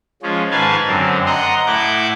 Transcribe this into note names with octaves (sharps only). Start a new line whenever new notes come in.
F3 G#3 C#4
G#2 D#3 B4 F5 G#5 A5
F#2 D3 C4
D#5 F#5 A#5 C6
A2 E4 F#5 D6 G6